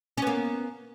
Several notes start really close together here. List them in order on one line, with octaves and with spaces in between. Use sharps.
C#4 B3 A#3